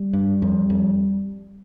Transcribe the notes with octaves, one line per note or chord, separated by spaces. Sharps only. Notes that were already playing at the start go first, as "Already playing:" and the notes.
Already playing: G3
G2
F2
F2